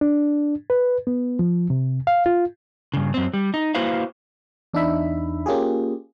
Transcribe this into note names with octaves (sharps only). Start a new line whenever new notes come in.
D4
B4
B3
F3
C3
F5
F4
G2 C#3
F#2 C4
G3
D#4
A#3 E4 F#4 B4 C5 F5
E2 D4 D#4 E5 B5
A#3 C#4 F4 G4 G#4